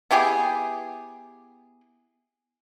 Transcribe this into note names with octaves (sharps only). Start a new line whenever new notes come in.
B3 E4 G4 G#4